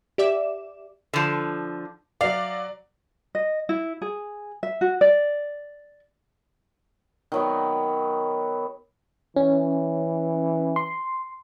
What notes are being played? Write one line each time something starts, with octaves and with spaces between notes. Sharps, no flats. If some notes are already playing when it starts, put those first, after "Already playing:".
G4 D5 E5 D6 E7
D3 F3
F#3 D5 F5
D#5
E4
G#4
E5
F#4
D5
D#3 F#3 B3
E3 C#4
C6